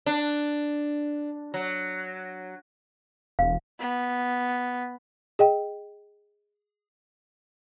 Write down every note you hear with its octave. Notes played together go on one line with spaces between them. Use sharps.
D4
F#3
E1 F5
B3
G#4 D#5 G5